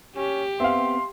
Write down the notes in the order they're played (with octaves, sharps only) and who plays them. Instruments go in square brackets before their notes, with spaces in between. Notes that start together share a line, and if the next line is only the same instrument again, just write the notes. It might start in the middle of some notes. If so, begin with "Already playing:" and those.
[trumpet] C#4 [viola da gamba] G4
[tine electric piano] B3 C4 [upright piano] E5 F5 [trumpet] C6